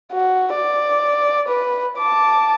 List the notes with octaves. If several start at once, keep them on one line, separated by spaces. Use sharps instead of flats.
F#4
D5
B4
A5 D6